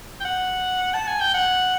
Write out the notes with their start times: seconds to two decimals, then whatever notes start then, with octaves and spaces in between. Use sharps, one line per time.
0.20 G5
0.25 F#5
0.94 A5
1.07 G#5
1.21 G5
1.34 F#5